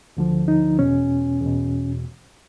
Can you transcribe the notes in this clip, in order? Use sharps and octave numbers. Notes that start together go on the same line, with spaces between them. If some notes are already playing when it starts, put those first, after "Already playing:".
D2 D3 F3
D#4
E2 B2 C#4
E2 B2